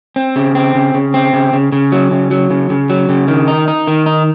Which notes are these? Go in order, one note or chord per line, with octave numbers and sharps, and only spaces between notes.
C4
C#3
C4
C#3
C#3
C4
C#3
C#3
C#3
F#3
C#3
F#3
C#3
C#3
F#3
C#3
D#3
D#4
D#4
D#3
D#4